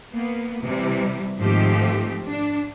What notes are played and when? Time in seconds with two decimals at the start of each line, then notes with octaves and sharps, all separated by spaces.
0.13 A#3 B3
0.64 C3 E3 G3
1.38 G#2 D#3 F3 A3 C4 G4
2.27 D4